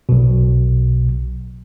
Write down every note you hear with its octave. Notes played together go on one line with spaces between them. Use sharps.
B1 B2